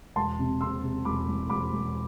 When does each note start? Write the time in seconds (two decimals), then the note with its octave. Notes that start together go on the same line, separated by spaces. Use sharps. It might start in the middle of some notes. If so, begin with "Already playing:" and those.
0.16 E1 A5 C6
0.39 C3
0.61 C3 C6 E6
0.83 C3
1.05 E1 B5 D6
1.27 E1
1.49 E1 B5 D6
1.72 E1